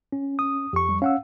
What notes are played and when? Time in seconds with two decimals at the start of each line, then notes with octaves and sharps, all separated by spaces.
0.12 C#4
0.39 D#6
0.73 F2 G4 C#6
0.89 G3
1.02 C#4 F5 F#5 E6